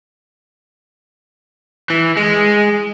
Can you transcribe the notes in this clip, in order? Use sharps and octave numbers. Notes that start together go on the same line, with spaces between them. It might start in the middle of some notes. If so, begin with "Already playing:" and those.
E3
G#3